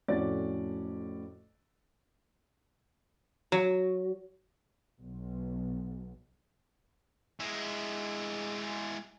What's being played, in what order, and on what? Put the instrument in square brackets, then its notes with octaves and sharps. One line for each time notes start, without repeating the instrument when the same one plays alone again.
[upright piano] F2 A2 C#4 F#4 D5 A6
[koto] F#3
[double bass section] B1
[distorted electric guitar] G#3 E4